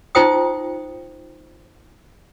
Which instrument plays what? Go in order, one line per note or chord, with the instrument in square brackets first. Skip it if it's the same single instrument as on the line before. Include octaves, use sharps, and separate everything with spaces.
[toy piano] D#4 F4 C5 G5 D#6